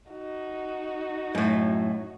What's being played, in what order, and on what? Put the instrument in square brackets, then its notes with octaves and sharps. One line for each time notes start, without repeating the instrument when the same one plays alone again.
[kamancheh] D#4 F#4
[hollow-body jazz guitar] F#2 A2